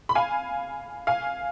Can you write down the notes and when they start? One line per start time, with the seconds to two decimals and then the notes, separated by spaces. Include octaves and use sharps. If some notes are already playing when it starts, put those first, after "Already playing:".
0.09 B5
0.15 F5 G#5
1.07 F5 G#5